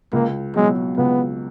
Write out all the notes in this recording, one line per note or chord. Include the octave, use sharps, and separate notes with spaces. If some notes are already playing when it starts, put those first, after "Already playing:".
C#2 A#3
B2 F#3 G#3
C#2 B3